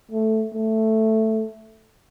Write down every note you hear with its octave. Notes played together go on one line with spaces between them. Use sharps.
A3
A3